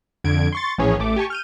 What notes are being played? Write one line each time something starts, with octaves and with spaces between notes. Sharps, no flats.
F2 D3 G#6 D7
C6 C#6 A6
A#1 A2 E3 C#4 G#4 C#5
A1 A3 D6
G4 G#5 A5 C#6
F6 G6 D#7